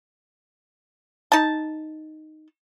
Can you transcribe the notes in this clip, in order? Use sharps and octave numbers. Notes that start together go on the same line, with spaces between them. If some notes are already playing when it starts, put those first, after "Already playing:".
D#4 A5